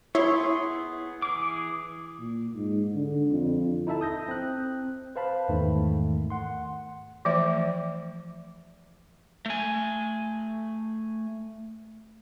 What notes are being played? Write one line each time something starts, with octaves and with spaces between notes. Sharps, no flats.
B3 E4 G#4 C#5 C6
E3 G#4 D6
A#2
G#2
D3
F2
D#4 E4 A4 E5 A5
D#6 G6 A#6
C4 F#6
B4 C5 F5 A5 B5
E2 G#2 D#3 A3
F#5 C6
E3 F3 A3 C5 E5
A3 G#5